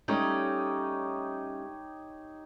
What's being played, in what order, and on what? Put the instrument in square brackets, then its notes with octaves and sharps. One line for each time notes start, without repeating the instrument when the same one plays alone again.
[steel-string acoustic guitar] G3 A3 C#4 [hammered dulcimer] D#4 G4 C#5